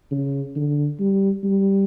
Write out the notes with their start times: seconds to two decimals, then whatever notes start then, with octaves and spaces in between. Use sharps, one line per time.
0.12 C#3
0.56 D3
1.00 G3
1.44 G3